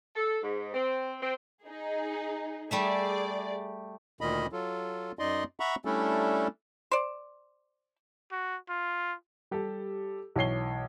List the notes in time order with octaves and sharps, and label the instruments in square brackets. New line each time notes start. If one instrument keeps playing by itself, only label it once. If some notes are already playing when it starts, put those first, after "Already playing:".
[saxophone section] A4
G#2
C4
C4
[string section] D#4 G#4
[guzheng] G3 A3 E5 [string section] G#4 D5
[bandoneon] D2 A#2 D#3 D#5 B5
F#3 F4 A4
F#2 D#4 D5 D#5 C6
E5 F#5 A#5 B5 C#6
G3 A3 C#4 D4 E4 A4
[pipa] C5 D5
[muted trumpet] F#4
F4
[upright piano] G3 G4 A4
B1 E3 C#5 C7 G7